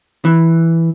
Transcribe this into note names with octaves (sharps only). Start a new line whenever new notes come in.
E3